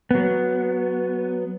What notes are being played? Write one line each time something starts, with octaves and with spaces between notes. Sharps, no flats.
F#3 B3